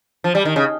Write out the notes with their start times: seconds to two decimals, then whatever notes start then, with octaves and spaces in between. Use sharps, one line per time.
0.24 F3
0.35 G3
0.45 D#3
0.56 C#3